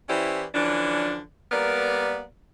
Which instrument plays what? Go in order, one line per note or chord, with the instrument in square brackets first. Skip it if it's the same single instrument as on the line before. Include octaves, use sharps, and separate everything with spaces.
[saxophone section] E3 C#4 E4 G4 C5 D5
D3 E3 F3 C#4 D4
G3 A#3 B3 A#4 D5